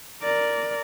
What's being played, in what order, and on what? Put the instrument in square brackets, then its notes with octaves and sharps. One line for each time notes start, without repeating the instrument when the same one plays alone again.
[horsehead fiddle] A#4 D5